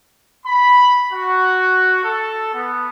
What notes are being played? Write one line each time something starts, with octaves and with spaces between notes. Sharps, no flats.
B5
F#4
A4
B3